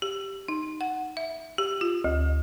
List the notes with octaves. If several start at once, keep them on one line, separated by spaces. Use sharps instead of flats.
G4
D#4
F#5
E5
G4
F4
D2